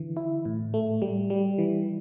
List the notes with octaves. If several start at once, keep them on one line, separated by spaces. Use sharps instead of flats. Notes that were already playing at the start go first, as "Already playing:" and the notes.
Already playing: D3 E3
E4
A2
A3
G3
G3
E3